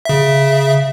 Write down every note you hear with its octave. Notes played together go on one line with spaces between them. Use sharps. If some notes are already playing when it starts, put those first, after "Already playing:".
C#3 E5